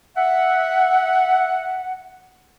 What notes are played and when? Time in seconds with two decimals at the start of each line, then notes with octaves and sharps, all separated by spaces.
0.15 E5 F#5